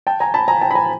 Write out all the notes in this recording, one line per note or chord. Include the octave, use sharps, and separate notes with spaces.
G5 A5
G#5 A#5
A5 B5
G#5 A#5
G5 A5
B5
G#5 A#5